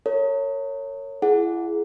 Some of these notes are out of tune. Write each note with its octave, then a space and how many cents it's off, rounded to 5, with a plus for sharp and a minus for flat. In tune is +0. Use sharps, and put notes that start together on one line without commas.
A#4 -40 C#5 -5
E4 +35 G#4 +25 F#5 -5